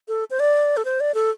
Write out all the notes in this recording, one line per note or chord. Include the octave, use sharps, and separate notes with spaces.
A4
C5
D5
A4
C5
D5
A4